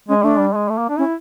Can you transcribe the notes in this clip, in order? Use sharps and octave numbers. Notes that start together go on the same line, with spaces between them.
G#3 C#4
A3 D4
G3
G#3
A3
A#3
D4
C#4 E4